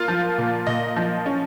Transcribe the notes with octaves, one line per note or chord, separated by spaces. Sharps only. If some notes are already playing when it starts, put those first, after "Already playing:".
Already playing: A#3 F4
F3
A#2
A#2 D#5
F3
C#4